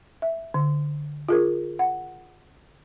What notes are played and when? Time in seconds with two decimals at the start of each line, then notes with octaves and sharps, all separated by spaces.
0.22 E5
0.54 D3
1.28 F4 G#4 A#4
1.79 F#5